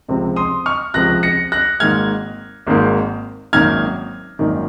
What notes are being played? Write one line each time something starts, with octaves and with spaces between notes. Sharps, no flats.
C#2 C3 F3 C4
C6 D#6
C#6 F6
C#2 C3 F3 C4 F#6 A#6
A#6 C#7
F#6 A#6
G#1 G#2 D#3 A#3 F6 G#6
G#1 G#2 D#3 A#3
G#1 F#2 D#3 A#3 D#4 F6 G#6
G#1 F#2 D#3 A#3 D#4